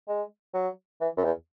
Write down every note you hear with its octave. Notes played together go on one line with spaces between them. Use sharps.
G#3
F#3
E3
F#2
E2